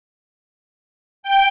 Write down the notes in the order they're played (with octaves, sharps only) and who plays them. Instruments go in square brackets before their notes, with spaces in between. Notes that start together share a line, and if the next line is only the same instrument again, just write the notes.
[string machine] G5